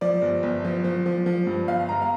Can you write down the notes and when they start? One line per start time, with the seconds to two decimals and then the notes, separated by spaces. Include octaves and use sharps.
0.01 F3 D5
0.22 G1
0.43 G1
0.65 F3
0.84 F3
1.06 F3
1.26 F3
1.47 G2
1.67 G1 F5
1.89 G1 A#5
2.02 F5